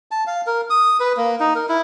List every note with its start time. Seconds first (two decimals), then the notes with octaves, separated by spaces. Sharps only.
0.11 A5
0.27 F5
0.47 A#4
0.70 D#6
1.00 B4
1.17 A#3
1.40 D#4
1.55 A#4
1.69 E4